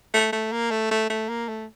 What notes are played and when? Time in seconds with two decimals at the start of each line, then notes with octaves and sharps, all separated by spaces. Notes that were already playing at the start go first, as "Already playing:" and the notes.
0.14 A3
0.33 A3
0.52 A#3
0.71 A3
0.91 A3
1.10 A3
1.29 A#3
1.48 A3